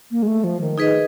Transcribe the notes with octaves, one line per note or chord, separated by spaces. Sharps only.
A#3
G#3
A3
F3
D#3
D#4 G#4 B4 D#5